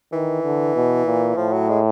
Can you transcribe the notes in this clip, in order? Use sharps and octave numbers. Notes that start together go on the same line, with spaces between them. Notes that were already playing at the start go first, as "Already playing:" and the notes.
D#3 E3
D3
B2
A#2
A2 F3
F#3
G#3